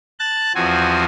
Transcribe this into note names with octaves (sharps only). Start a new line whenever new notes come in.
A5 F#6 A6
E2 F3 C4 F#4 G#5